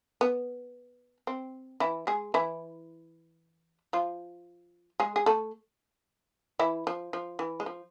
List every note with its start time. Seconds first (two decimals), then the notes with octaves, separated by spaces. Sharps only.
0.21 B3
1.27 C4
1.80 E3 E4
2.07 G#3 G#4
2.34 E3 E4
3.93 F3 F4
5.00 G#3 G#4
5.16 G#4
5.26 A3 A4
6.59 E3 E4
6.87 F3
7.13 F3
7.39 E3
7.60 G#3
7.66 F3